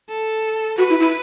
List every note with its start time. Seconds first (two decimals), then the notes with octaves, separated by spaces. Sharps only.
0.10 A4
0.78 F#4 B4
0.90 E4
1.00 E4